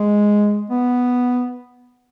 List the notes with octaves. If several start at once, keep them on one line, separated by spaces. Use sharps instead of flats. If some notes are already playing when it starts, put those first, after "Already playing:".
Already playing: G#3
B3